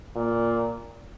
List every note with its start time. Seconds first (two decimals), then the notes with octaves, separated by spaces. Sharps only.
0.15 A#2